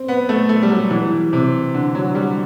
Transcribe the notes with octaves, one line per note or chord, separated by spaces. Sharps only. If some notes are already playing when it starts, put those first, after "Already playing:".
Already playing: C4
B3
A3
A3
G3
F#3
E3
C3
D3
F#3
G3